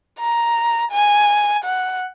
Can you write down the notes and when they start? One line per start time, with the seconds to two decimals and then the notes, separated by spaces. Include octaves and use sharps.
0.20 A#5
0.92 G#5
1.64 F#5